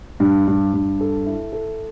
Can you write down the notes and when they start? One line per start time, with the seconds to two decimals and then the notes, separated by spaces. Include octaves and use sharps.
0.20 G2
0.48 G2
0.74 G2
1.01 A4
1.26 E4
1.53 A4